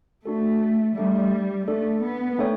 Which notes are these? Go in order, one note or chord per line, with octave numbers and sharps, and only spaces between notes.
A3 D4 F#4 A4
G3 A3 D4 A4 E5
A3 D4 A4 D5
B3
A3 D4 A4 C#5 G5